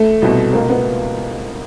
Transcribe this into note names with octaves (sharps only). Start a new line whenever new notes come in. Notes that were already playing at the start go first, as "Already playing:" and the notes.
Already playing: A3
C2 B2
C#2 B2 A#3
B3